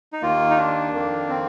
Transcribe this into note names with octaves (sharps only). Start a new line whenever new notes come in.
D#4
D#2 D#3 A#3 F4
D#4
D4
F2 D#3 A#3
C4